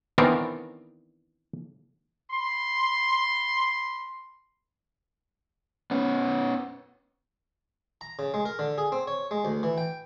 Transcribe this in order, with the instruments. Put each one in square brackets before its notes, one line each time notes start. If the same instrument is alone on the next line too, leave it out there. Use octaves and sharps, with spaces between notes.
[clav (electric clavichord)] D#3 E3 B3 C4 D4 A#4
[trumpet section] B5 C6
[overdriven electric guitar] B3 C#4
[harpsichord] A#5
C#3
G#3
A#4
D3
G#4
C4
C#5
G#3
D2
E3
G5